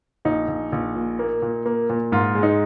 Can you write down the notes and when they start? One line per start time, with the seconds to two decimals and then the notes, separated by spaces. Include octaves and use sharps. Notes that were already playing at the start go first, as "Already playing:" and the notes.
0.25 A#1 D#4
0.48 A#1
0.72 A#1
0.96 A#2
1.19 A#3
1.42 A#2
1.66 A#3
1.89 A#2
2.12 G#2 F4
2.35 G#3
2.43 D#4